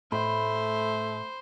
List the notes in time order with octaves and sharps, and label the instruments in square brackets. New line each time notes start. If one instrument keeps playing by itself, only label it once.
[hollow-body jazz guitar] A2 [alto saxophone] A3 [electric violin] C5 [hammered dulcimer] B5